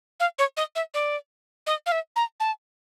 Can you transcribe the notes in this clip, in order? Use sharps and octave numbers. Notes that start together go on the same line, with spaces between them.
F5
C#5
D#5
E5
D5
D#5
F5
E5
A#5
A5